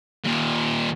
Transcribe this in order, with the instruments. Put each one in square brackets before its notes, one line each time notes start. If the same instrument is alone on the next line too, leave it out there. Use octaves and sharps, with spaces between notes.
[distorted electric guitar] D#2 A#2